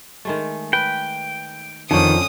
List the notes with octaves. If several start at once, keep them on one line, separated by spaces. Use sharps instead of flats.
D#3 G#3 A3
B4 G5
F2 D3 D#3 C#4 F4 A5 D#6